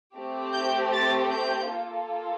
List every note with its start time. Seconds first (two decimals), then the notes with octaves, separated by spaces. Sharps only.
0.15 A3 C4 G4
0.53 G6
0.92 A6
1.30 G6
1.70 A#3 F4 A4